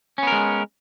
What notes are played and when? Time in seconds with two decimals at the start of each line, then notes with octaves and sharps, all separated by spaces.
0.18 C#4
0.23 B3
0.27 A#4
0.32 G#3